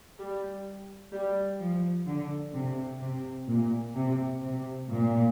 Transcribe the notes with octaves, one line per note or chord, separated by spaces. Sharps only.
G3
G3
F3
D3
C3
C3
A#2
C3
C3
A#2